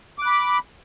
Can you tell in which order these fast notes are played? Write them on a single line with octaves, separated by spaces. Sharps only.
D6 F#6 B5